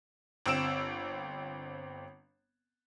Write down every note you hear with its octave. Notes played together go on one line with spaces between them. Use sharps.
G1 C4 E6 D7 E7